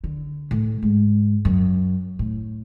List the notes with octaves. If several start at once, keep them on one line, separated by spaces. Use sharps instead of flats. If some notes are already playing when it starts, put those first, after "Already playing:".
D3
A2
G#2
F#2
A2